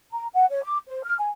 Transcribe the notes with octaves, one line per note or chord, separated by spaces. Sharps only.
A#5
F#5
C#5
D6
C5
F6
G#5